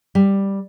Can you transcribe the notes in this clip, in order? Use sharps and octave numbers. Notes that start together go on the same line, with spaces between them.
G3